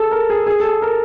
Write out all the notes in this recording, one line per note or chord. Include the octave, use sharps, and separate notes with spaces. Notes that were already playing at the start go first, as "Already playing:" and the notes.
Already playing: G#4 A4
A#4
G#4
G#4
A4
G#4
A#4